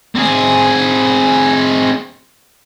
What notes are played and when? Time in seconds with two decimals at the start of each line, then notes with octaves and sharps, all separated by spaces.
0.15 C4 G#4